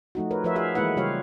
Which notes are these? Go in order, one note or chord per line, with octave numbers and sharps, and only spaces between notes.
F3 A3 D#4 F#4
A#4 B4 C#5
F3 F4 A#4 B4 C#5 E5
F#4 G#4 E5 F5
E3 G#3 A#3 E4 B4 F#5
C#3 G3 F4 G4 C#5 F5